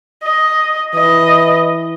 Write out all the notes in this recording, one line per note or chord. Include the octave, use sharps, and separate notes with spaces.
D#5
E3 D#5